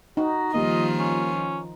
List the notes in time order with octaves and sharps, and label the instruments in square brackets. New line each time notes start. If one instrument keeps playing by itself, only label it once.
[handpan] D#4 [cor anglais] F#4
[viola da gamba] D#3 F3 F4 [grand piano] G3 A#3 [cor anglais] D#5
[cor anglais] C#4